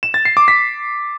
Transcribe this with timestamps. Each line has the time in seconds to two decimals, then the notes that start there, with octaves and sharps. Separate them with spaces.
0.03 E7
0.14 A6
0.25 C7
0.37 D6
0.48 B6